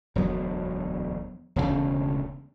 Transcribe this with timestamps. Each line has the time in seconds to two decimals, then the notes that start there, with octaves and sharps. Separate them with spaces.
0.15 E1 D2 F#3 B3
1.56 E1 A1 D2 C#3